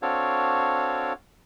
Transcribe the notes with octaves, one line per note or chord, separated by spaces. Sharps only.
C4 D4 F#4 A4 C#5 F5